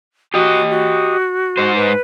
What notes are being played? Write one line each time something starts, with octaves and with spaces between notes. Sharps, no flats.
F#4 G4 D#5
F#4
G#2 C5
B4